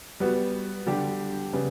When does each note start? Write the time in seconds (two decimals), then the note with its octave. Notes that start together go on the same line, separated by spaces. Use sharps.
0.20 G3 B3 F#4
0.86 D3 G3 D4 G4
1.53 C#3 G3 B3